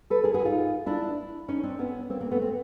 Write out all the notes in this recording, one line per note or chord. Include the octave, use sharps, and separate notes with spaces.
A4 B4
G#4 A#4
F#4 G#4
D#4 F4
D4 E4
C#4 D#4
C4 D4
B3 C#4
A#3 C4
A#3 C4
A3 B3
C4